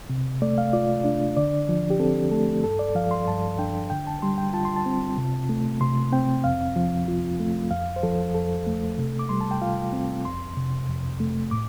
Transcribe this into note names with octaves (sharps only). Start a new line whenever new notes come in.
C3
A3 D5
F5
F4 D5
D4
D3 D5
F3
G4
C4 A4
A3 A4
G2 A4
D5
F3 F5
C6
G2 A5
D4 G5
D3 G5
A5
G3 C6
G5
F4 A5
C6
A5
C4
C3
A3
C3 C6
C4 G5
F2 F5
F3
F4
A3
F2 F5
C5
F3 A4
F2 A4
A3
C3
D6
G3 C6
A5
G5
F4 F5
C4
F2 C6
C3
F2
A3
A2 D6